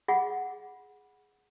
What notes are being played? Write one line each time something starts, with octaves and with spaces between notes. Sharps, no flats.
F4 G#4 F#5